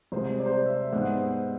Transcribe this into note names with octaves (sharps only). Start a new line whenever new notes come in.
C2 C3 G#3 C5
D5
C5
D5
E5
G#2 G#3 B3